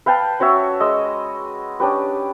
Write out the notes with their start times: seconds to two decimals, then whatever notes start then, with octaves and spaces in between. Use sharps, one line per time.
0.06 B4 F5 G5 A5
0.40 C#4 F#4 C#5 E5
0.80 G#3 D#5 E6
1.80 C#4 D4 G4 B4